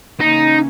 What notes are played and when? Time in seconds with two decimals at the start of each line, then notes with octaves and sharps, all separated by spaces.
0.20 C#3 E3 A#3 C#4 D#4